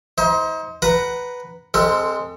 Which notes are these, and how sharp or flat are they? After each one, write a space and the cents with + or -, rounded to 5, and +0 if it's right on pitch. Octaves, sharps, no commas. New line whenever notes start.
D#4 +40 C5 +0
B4 +0 F#5 +15 A#5 +0
G#3 +0 C4 +0 A4 +35